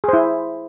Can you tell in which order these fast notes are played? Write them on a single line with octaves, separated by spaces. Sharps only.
G#4 C5 E4